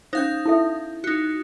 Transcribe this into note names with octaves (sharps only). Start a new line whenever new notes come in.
C#4 D#4 C5 F5 G6
E4 A4 E5
D#4 F#4